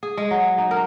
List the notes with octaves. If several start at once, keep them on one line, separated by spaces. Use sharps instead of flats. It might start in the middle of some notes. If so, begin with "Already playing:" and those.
G#4
G#3
F#3
D#4
A#4